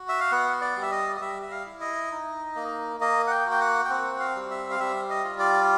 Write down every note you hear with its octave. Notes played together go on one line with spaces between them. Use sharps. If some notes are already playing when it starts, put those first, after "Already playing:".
Already playing: F#4
E5
F5
B3 F#5
D5
G3
E5
D#5
D#5
G3 E5
E5
F5
E4
D#5
D#4
A#3
A#3 D#5
F#5
G5
F#4
G5
F#5
G5
C4 F#5
F5
G3
E5
F5
G3 E5
D#5
F4
D5